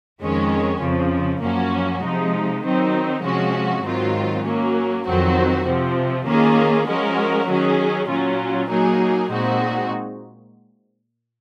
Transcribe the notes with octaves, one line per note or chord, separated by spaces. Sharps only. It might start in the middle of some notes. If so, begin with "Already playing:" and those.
F2 D#3 G#3 C#4
F2 C#3 F3
F#2 F3 A#3 C#4 F#4
C3 F3 G#3 D#4
D#3 F#3 C4 D#4
C3 F3 G#3 C#4 F#4
G#2 D#3 F#3 C4 F4
F#3 A#3 C#4
F2 D#3 F#3 C4 F#4
C3 F3 C4
D#3 A#3 C#4 F4 G#4
F3 G#3 C#4 F#4 A#4
D#3 F#3 C#4 G#4
A#2 F#3 C#4 F4
F#3 A#3 D#4 G#4
A#2 G#3 C4 D#4 F#4